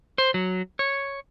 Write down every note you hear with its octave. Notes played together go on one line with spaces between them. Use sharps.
C5
F#3
C#5